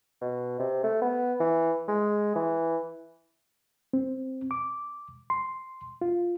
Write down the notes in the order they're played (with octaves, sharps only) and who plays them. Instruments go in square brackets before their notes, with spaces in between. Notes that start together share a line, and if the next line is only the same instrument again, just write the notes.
[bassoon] B2
C3
A3
B3
E3
G#3
E3
[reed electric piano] C4
D6
C6
F4